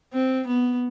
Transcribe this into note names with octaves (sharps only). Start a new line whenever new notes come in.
C4
B3